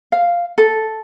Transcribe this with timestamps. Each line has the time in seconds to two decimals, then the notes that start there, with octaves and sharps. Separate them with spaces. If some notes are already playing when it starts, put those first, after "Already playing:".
0.12 F5
0.58 A4